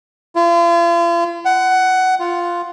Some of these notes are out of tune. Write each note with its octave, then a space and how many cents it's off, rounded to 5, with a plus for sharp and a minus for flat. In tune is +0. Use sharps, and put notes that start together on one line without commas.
F4 -40
F#5 +15
F4 -5